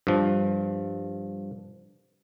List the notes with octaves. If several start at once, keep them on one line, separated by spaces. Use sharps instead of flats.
G2 F3